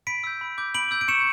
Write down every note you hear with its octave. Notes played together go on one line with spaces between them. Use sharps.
B5 B6 D7
E6 G6
B5
D6 G6
B5 D7 F#7
E6 G6
D7
C#6 C#7 E7